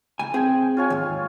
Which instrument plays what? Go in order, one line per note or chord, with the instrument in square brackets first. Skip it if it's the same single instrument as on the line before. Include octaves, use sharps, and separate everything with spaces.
[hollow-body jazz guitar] C#2 G#5
[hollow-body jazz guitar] C4 G#4 [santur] G5 G#5
[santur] F4 C#5 G#5
[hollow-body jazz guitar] D#2 G#2